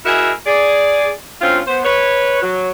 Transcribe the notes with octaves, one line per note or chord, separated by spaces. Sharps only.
E4 F#4 G#4 A#4 D#5 E5
G#4 D5
D2 C4 C#4 F4
B3 C5
B4 C#5
F#3